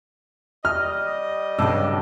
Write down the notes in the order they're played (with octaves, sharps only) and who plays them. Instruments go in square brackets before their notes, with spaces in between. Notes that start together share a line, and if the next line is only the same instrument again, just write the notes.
[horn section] G3 D#5 [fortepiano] F6
[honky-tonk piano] B1 A5 E6 [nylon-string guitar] G2 C#3